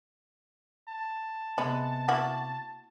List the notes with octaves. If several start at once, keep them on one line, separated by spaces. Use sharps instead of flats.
A5
C3 G#3 B3 B5
A#3 E4 F#4